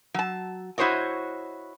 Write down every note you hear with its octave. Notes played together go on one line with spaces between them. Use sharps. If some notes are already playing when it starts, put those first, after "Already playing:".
F#3 A5
E4 F#4 C5 C#5 D#5